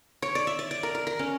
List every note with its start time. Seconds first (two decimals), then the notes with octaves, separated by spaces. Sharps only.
0.22 C#5
0.35 D5
0.47 E5
0.59 D5
0.71 D5
0.83 A#4
0.95 A#4
1.07 A#4
1.19 C#4